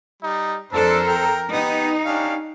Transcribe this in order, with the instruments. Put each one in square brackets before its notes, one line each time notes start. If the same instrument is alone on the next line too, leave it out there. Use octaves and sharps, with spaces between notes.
[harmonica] G3 [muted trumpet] D#4
[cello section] F2 A4 C5 [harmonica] D4 A5 E6 [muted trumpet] A#4
[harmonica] G5 A#5
[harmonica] B3 G4 [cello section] D#4
[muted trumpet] C#4 [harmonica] D4 G4 F5